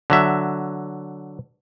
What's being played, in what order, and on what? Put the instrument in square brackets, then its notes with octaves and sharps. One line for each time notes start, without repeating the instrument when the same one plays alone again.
[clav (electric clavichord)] D3 F#3 E5